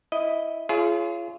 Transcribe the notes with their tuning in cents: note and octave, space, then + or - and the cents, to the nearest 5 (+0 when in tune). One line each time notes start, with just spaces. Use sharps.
E4 -5 D#5 +0
F4 -30 G#4 +25 C#5 +0